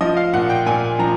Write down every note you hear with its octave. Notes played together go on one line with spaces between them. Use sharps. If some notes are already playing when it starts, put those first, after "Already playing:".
F3 D#5
F5
A#2 F#5
G5
A#2 G#5
F3 A#5